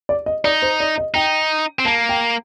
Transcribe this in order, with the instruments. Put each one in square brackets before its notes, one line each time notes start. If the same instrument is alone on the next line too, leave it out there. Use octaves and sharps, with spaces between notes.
[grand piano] D5
D#5
[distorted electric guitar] D#4 [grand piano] D5
[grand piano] C5
D5
D#5
[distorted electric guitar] D#4 [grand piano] G5
[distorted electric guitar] C4
[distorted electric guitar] A#3 [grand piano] A5
[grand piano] G5